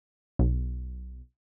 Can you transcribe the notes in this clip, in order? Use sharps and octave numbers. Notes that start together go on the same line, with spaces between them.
B1